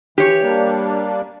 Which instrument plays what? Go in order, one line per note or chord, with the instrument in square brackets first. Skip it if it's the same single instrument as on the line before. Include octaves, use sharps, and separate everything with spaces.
[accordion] E3 [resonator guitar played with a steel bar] G4 C#5
[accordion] G3 A#3 D4